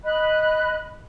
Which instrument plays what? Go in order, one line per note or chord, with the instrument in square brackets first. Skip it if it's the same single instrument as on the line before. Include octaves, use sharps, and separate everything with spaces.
[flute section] D#5 B5 F#6